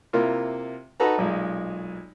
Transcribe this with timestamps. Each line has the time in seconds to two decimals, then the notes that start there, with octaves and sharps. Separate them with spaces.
0.13 C3 A#3 E4 F4
1.00 D#4 F#4 A4 B4 A#5
1.18 B1 A#2 G#3